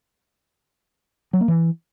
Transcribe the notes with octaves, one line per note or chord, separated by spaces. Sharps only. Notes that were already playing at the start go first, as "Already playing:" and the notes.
F#3
A#3
E3